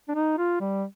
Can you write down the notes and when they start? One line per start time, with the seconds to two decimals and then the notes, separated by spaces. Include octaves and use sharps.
0.08 D4
0.15 D#4
0.38 F4
0.61 G3